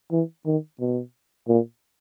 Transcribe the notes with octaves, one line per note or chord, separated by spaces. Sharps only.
E3
D#3
B2
A#2